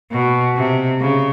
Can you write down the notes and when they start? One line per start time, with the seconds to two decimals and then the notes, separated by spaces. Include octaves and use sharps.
0.12 B2
0.56 C3
1.00 C#3